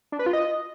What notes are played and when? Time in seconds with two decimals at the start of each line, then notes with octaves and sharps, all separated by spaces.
0.12 D4
0.19 B4
0.26 F4
0.33 D#5